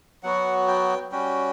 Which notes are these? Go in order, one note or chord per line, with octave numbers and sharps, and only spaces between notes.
F#3 B3 F#4 F#5
G5
G3 C#4 F#4 G5